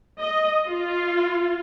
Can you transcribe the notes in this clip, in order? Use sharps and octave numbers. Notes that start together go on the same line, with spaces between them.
D#5
F4